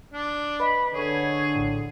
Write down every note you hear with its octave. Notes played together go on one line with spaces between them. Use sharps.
D4
B4 D#5 B5
D3 G#4 C#5
A#1 A2